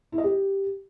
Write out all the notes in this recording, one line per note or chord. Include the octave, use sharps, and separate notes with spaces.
E4
D#5
G4